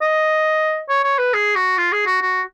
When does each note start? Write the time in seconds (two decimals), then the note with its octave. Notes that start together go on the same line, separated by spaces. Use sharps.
0.02 D#5
0.89 C#5
1.04 C#5
1.19 B4
1.34 G#4
1.56 F#4
1.78 F4
1.92 G#4
2.06 F#4
2.22 F#4